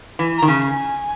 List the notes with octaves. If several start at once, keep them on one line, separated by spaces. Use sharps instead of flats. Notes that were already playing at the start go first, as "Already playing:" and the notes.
E3
D#3 A#5
C#3 G#5